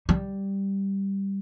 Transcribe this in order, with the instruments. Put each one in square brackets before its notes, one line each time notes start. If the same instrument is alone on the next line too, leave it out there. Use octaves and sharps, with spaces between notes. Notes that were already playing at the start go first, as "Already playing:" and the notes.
[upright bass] G3